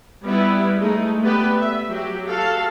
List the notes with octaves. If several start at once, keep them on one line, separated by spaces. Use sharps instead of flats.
G3 B3 E4
G#3 A3 D#4
A3 B3 G4 B4 D5
E5
F#3 G4
F#4 A4 F5 A5